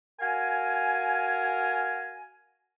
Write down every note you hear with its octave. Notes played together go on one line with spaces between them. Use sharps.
F#4 A#4 F5 G#5